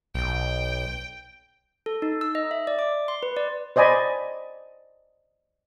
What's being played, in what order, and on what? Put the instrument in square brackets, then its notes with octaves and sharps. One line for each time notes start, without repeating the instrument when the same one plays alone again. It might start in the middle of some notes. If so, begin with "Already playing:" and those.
[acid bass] B1 [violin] G5
[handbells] A4
D#4
E6
D#5
E5
D5
D6
C6
B4
D5
[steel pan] C5 D5 D#5 G#5 B5